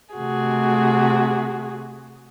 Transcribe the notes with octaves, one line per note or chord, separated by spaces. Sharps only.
C3 A3 F#4 G#4